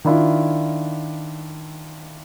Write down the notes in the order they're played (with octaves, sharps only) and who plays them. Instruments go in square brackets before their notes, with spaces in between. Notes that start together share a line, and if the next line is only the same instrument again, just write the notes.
[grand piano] D#3 D4 E4 F4